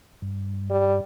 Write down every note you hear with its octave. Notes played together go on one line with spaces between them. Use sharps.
G2
G3